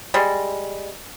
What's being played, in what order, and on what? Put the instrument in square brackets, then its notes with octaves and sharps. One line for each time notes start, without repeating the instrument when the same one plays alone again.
[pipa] G3 G#3